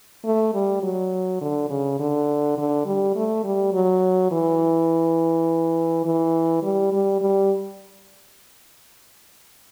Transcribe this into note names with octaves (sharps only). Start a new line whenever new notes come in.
A3
G3
F#3
D3
C#3
D3
D3
G3
A3
G3
F#3
E3
E3
G3
G3
G3